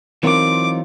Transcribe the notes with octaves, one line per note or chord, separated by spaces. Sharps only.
E3 F#3 C4 D#4 F4 A#4 D6